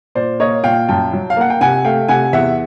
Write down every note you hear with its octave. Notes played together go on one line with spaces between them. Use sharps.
A#2 C5 D5
A#3 C#5 D#5
A#2 F5 G5
F#2 G5 A5
F#3
F5
A#3 F#5
G5
C3 F#5 G#5
A3 F5 G5
C3 F#5 G#5
E2 E5 F#5